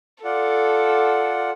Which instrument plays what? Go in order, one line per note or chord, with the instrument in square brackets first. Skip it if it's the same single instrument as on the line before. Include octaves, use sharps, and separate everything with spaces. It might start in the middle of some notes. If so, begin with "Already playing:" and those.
[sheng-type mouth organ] F4 D5 F#5 [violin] A4